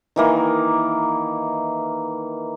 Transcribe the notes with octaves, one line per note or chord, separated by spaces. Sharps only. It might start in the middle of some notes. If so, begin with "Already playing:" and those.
D#3 E3 A#3